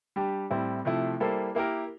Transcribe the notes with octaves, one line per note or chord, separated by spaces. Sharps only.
G3 D4 G4
A2 G3 C4 E4
C3 F3 A3 E4
G3 A#3 E4 A4 C5
A#3 E4 G4 A#4